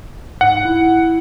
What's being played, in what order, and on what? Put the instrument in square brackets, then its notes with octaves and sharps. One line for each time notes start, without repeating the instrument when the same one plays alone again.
[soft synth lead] G#2 [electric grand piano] F#5
[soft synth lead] E4